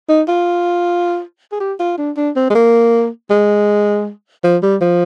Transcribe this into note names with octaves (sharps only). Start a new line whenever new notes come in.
D#4
F4
G#4
G4
F4
D4
D4
C4
G#3
A#3
G#3
F3
G3
F3